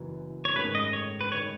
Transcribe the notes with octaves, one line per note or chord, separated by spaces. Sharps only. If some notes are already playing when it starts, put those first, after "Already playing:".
Already playing: F#1 F#2 E3
C#5
G#2 D#3 A3 C#4 G#4 B4
D#5
C#5
B4
D#3 G#3 C#5